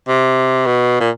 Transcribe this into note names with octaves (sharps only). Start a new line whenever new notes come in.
C3
B2
A#2